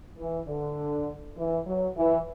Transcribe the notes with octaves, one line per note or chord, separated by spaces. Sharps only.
E3
D3
E3
F#3
E3